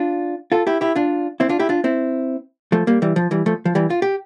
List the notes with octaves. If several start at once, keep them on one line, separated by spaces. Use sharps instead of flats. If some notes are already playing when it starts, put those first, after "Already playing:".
Already playing: D4 F4
F4 A4
E4 G4
E4 G4
D4 F4
C4 E4
D4 F4
E4 G4
D4 F4
C4 E4
F3 A3
G3 A#3
E3 G3
F3
E3 G3
F3 A3
F3
E3 G3
F4
G4